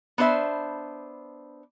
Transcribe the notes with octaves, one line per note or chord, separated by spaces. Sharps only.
B3 D4 C5 E5